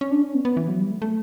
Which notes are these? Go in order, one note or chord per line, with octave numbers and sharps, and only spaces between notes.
C#4
D4
C#4
B3
B3
E3
F#3
G3
A3
A3